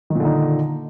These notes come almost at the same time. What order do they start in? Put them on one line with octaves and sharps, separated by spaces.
D#3 A#2 D3 D#4